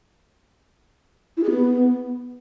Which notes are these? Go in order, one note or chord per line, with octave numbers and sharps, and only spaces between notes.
E4
G#4
B3